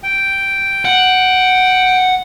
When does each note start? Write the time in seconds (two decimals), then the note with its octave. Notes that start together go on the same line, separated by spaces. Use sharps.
0.03 G5
0.85 F#5